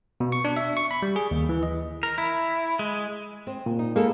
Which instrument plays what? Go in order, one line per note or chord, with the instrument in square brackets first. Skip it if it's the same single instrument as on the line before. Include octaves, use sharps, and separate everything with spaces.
[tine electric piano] B2
C#6
D4
E5
C#6
B5
G3
G#4
D#2
E3
D#5
[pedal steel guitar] A#4
E4
G#3
[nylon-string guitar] C4
[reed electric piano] A#2
[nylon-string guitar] D#4
[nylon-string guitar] G#3 B3 A4 [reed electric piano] A#3